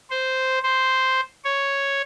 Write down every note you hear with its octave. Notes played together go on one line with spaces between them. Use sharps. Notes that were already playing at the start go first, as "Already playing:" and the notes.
C5
C5
C#5